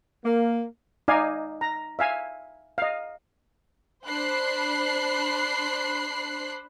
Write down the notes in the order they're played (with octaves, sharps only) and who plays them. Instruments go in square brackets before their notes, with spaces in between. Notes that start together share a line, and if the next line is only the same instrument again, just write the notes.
[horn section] A#3
[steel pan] D#4 D5 D#5 F5 G#5
A#5
E5 F5 G#5
D#5 F5
[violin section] D4 C5 B5 F#6 C7